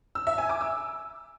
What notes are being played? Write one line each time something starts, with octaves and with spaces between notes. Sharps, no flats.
E6
E5
G#5
D6
E6